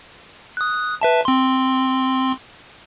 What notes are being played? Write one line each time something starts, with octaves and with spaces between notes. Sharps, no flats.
D#6 F#6
B4 E5 A5
C4 C6